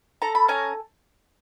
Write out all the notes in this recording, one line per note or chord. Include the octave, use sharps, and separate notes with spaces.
A4 A#5
B5
C#4 G#5 A#5